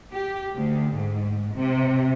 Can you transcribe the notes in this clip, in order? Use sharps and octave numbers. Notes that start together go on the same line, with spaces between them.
G4
D2
G#2
C3